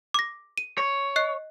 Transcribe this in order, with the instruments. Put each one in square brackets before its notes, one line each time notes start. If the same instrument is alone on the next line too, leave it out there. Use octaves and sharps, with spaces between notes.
[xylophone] D6 A#6
D#7
[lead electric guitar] C#5
[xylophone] D#5 F#6 C7